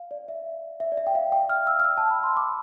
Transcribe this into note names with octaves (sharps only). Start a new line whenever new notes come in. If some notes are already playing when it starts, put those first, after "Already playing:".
Already playing: F5
D5
E5
E5
D5
E5
G5
F5
G5
F6
E6
F6
E6
A5
B5
C6
D6